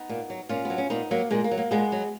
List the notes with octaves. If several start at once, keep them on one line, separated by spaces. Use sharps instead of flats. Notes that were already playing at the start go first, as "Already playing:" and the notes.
Already playing: B3 D#4
A#2
F#3
A#2 C#4 F4
B3
F#3
C#4
A#2 B3 D#4
F#3 A#3
A#2 G#3
A#3
F#3
A#3
A#2 G#3 B3
F#3